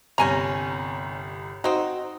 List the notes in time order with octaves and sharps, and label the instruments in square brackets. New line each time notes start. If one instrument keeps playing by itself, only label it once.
[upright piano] G1 C2 [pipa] C#4 G#5 A#5
[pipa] C4 D#4 [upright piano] F#4